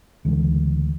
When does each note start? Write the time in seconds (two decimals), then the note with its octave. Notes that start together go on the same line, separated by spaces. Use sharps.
0.25 D2 C#3 E3 G#3